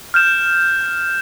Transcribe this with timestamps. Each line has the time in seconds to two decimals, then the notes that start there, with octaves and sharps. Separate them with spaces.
0.14 F6 G6 E7